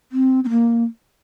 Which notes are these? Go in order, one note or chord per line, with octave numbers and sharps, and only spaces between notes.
C4
C4
A#3